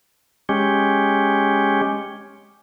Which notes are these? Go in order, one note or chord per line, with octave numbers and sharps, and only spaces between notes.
G#3 C#4 G4